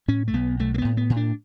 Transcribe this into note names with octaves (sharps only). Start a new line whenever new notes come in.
A2 C#4
A3
B1 B3
B1 A3
A3
B3
A2
B3
A2
D4